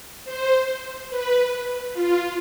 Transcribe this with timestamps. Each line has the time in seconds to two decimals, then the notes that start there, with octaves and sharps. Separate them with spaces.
0.25 C5
1.10 B4
1.94 F4